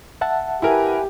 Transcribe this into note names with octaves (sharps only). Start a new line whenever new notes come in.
E5 F#5 A5
E4 G4 A#4 B4 G#5